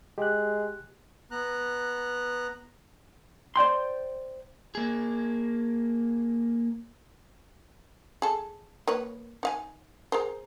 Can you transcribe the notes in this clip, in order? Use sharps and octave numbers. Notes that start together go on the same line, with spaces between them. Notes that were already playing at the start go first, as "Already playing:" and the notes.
G#3 G4 F#6
B3 A#5 F#6
C5 D5 G5 C6
A#3 G#4
G#4 A4
A#3 B4 C#5
D#4 F5 G#5
G#4 A#4 C5